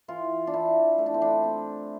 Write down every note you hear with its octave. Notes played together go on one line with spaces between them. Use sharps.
E3 F4
D4
E3 E4
A3 E4
D4
C4
D4
C4